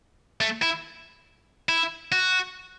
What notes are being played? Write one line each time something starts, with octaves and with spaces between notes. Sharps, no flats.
A3
E4
E4
F#4